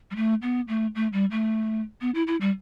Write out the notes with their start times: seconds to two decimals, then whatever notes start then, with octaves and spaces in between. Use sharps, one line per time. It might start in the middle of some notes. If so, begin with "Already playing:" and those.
0.11 G3
0.16 A3
0.42 B3
0.68 A3
0.95 A3
1.13 G3
1.31 A3
2.01 B3
2.15 E4
2.27 E4
2.41 G3